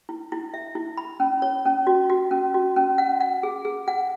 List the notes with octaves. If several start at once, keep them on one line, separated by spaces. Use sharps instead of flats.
E4
E4
E5
E4
B5
C#4
C#5
C#4
F#4
F#4
C#4
F#4
C#4
F#5
F#5
G#4
G#4
F#5